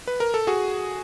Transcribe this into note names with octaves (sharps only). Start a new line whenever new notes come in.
B4
A#4
A4
F#4 G#4